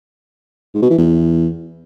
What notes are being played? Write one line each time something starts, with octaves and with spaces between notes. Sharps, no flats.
G#2
B2
E3
E2